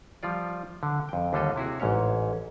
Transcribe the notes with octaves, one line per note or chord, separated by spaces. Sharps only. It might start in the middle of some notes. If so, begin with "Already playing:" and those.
F3 G3 F4 D5
D3
F2 G5
D#2 D3 G3 F4 A4 D#5
C3 E4 F#4 G#4
A1 G#2 C#4 C#5